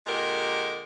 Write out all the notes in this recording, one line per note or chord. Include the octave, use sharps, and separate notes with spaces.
A#2 D3 G#3 G4 A#4